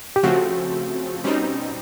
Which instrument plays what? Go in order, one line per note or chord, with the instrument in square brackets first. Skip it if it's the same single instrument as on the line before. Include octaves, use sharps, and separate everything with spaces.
[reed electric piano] G4
[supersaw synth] C#3 F3 A3 C4 [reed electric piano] F#4
[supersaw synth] B2 G3 C4 D#4 [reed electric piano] C#4